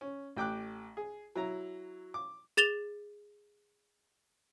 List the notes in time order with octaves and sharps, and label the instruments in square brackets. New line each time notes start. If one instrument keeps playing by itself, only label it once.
[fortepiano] C#4
A1 G5 D6 F#6
G#4
F#3 E4 A#5
D6
[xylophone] G#4 A6 E7 F7 G7